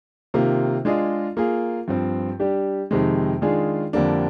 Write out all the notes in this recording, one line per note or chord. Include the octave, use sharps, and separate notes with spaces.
C3 D#3 A#3 F4
G#3 D4 F4 G#4 D#5
A#3 F4 G#4
G2 F3 C4
G3 D4 G4
F2 C3 D#3 G#3
D#3 G#3 D4 F4 G#4
F2 D3 G3 A#3 D4